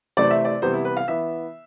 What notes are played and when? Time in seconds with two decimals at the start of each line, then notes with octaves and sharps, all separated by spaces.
0.17 C3 E3 A3 C4 D5
0.31 E5
0.45 D5
0.62 C3 E3 G3 B3 C5
0.74 E4
0.85 B4
0.97 F5
1.08 E3 B3 E5